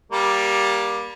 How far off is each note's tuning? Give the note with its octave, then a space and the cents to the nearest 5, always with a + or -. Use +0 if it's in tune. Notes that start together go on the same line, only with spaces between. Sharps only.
G3 +0 A#3 +20